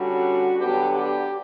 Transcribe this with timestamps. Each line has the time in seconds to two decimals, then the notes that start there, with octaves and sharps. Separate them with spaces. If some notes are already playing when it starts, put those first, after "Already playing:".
Already playing: D3 G3 C#4 F#4
0.57 D3 F#3 B3 D4 G4
0.93 G4